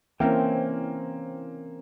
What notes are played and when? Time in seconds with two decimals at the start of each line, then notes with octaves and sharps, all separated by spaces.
0.20 E3 A#3 C4 C#4 A#4 E5 G5